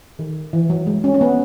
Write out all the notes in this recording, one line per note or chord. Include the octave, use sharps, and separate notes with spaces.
D#3
E3
F#3
G#3
C#4
C#4
B3